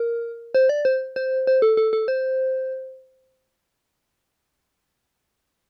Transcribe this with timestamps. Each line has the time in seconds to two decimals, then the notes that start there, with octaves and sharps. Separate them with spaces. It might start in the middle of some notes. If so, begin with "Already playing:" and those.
Already playing: A#4
0.55 C5
0.69 D5
0.85 C5
1.16 C5
1.47 C5
1.62 A4
1.77 A4
1.93 A4
2.08 C5